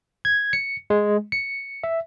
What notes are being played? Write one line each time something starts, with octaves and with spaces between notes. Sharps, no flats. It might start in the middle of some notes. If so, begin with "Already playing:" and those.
G#6
C#7
G#3
C#7
E5